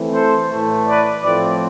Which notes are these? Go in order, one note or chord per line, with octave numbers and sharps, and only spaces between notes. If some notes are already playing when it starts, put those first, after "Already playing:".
Already playing: E3 A3 C4
A4 C5
A2 E3 A3
B4 D5
A2 F3 A3 C4 B4 D5